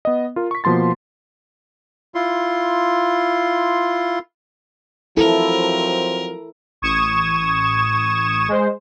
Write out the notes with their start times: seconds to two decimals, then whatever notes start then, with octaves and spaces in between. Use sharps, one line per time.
0.05 B3 D#5
0.36 F4 A#4
0.51 C#6 B6
0.64 B2 F3 A#3 C6 A6
2.15 E4 F4 C6
5.17 F3 F#3 C4 E4 A4 A#4
6.82 A1 C#6 D#6 G#6 E7
8.48 G#3 C5